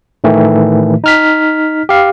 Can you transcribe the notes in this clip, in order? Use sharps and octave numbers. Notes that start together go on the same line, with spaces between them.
A2 D#3 E3 A3
D#4 F6 B6
G4 F5